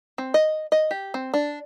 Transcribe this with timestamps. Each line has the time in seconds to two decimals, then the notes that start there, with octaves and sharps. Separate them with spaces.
0.18 C4
0.34 D#5
0.72 D#5
0.91 G4
1.14 C4
1.34 D4